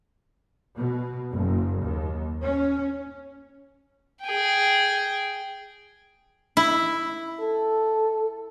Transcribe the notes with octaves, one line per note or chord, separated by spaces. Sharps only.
B2
F#1
D#2
C#4
G#4 G5
E4
A4